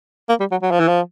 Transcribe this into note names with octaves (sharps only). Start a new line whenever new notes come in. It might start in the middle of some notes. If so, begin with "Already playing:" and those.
A#3
G3
F#3
F#3
F3
E3
F3